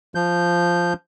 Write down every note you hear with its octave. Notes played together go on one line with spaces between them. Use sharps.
F3 G6